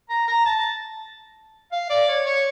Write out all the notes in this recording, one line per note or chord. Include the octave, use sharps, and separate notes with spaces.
A#5
A#5
A5
F5
D5
C#5
C#5